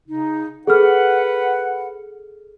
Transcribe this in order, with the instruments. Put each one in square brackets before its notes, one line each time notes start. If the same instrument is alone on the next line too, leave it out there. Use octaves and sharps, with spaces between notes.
[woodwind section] C#3 D#4
[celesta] G#4 A4 F6 [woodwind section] B4 F#5